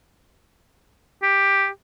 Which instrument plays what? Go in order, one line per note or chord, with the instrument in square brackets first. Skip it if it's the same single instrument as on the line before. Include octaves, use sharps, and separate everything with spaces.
[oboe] G4